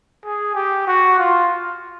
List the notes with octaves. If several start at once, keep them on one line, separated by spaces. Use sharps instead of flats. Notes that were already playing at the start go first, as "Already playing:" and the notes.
G#4
G4
F#4
F4